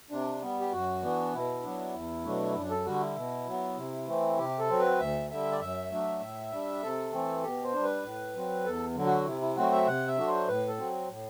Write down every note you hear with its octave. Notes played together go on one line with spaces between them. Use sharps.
C3 D4
G3 B3
G4
F#2 F#4
E3 B3 D4
B2 E4
F#3 B3 D4
E2
B2 F#3 A3 D4
F#2 D4
A4
D3 G3 F#4
E4
B2
F#3 B3
C3
E3 A3 C4
C3 G4
A4
F#3 C4
B4
D2 E5
D3 G3 E5
D5
F#2 E5
F#3 A3 D4
A2
G3 D4
C3 A4
E3 A3 C4
B2 G4
C5
G3 D4
B4
A2
F#3 C4
E2 A4
D3 F#3
F#4
C3 E4
E4
F#3 A3 C4 F#4
E5
C3 F#5
E5
F#3 A3 D4
C5
A2 B4
A4
F#3 C4
A2